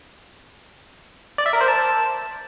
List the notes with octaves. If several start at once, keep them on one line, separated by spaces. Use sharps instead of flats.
D5
E5
A#4
C5
A5